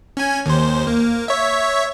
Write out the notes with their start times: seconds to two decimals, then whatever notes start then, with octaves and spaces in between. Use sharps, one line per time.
0.17 C#4 G#5
0.46 D#2 C5
0.87 A#3
1.28 C#5 E5